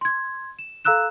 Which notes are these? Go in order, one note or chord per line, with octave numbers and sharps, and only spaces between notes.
C6 G#6
E7
A4 F5 A#5 E6 F#6 E7